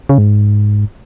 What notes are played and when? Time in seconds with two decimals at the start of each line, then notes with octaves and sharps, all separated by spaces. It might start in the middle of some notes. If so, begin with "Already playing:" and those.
0.09 C#3
0.18 G#2